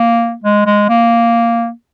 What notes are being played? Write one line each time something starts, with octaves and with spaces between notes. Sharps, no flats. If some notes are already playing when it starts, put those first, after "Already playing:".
Already playing: A#3
G#3
G#3
A#3